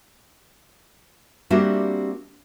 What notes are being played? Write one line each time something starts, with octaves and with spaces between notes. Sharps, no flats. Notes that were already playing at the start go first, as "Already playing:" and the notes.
G3 A#3 C4 D4 F#4 E5